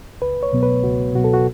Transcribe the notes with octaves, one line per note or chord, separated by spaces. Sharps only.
C#2 B4
C#5
B2 F#3 B3
B4
C#2 F#4
B2 F#3 B3 F#4
A4
F#4